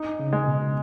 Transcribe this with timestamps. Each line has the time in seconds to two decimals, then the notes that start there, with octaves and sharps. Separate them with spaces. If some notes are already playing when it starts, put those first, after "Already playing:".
Already playing: D#4
0.20 C#3
0.33 G#3
0.48 B2